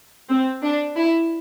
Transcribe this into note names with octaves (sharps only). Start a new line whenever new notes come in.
C4
D4
E4